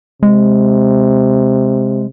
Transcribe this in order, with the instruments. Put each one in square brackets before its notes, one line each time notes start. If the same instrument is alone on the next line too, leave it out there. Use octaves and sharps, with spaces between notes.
[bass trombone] C3 [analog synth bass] G#3